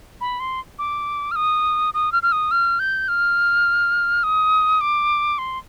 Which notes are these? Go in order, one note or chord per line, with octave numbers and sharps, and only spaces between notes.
B5
C6
D6
F6
D#6
D#6
F6
F6
D#6
F6
G6
F6
D#6
D6
C6